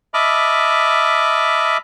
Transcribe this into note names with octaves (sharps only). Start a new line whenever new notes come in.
D#5 E5 A5 B5 D6 F6